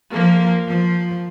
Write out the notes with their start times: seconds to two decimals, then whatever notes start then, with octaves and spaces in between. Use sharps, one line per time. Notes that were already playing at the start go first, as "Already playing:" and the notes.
0.12 F3 A#3
0.66 F3